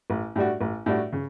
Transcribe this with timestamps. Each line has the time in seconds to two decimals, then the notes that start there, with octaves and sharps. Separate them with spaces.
0.10 A1
0.36 A2 G3 D4 F#4
0.61 A1
0.86 A2 G3 D4 F#4
1.13 C#3